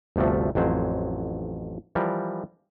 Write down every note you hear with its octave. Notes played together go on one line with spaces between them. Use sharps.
G1 D2 C3 F3 A3
A1 F2 F#3 C5
E3 F3 G3 A#4